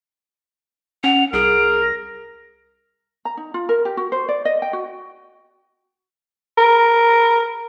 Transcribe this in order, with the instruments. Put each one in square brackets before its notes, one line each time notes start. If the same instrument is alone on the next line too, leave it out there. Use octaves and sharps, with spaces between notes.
[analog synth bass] C#4 [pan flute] F#5 [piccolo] F7
[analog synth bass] C2 [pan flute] G#4 [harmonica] A#4 F6 [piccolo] D7
[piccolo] A#6
[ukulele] A#5
D#4
F4
A#4
G4
F#4
C5
D5
D#5
G5
F#4
[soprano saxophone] A#4